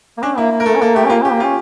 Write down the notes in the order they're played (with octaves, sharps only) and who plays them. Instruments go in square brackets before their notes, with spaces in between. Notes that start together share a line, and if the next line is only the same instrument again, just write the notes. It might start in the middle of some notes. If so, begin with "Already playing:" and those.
[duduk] A#3
[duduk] C#4 [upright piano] D4
[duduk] A#3 [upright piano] E4
[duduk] A#3
[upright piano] A#4
[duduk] A3 [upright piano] A4
[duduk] C#4
[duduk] A#3 [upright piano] A4
[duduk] A3 [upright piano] G4
[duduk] C#4
[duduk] A#3 [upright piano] F4
[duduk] C#4 [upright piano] G4
[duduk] A#3
[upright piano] F4
[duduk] C#4